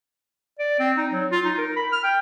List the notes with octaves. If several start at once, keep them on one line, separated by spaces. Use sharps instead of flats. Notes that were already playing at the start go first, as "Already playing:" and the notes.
D5
C4
D#4
F#3
F4
D#4
A#4
B5
F6
G5